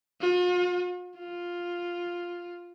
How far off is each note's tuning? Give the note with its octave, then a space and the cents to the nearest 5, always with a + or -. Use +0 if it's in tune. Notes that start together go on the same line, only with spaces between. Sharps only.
F4 +45
F4 +5